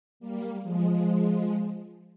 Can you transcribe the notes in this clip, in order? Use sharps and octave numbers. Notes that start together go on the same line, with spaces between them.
G3 A#3
F3 G#3